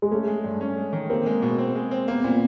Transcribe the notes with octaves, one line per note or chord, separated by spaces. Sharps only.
G#3
A3 C#4
G#3
G2
C#4
G#3
D#3
A#3 C4
G#3
B2
C4
G#3
C4
A#3 B3
A#2 C4